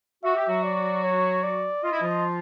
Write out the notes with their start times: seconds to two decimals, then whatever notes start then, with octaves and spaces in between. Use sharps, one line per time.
0.23 F#4 E5
0.36 G4
0.48 F#3 F#4
0.63 D5
1.04 C#5
1.43 D5
1.83 F4 D#5
1.92 E4
2.01 F3 F4